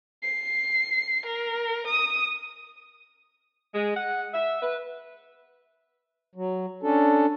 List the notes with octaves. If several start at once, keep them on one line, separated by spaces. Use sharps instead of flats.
C7
A#4
D#6
G#3
F#5
E5
B4
F#3
C#4 D4 A4